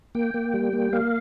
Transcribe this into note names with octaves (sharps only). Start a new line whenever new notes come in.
A#3 G5
A#3
G3
A#3
A#3 F5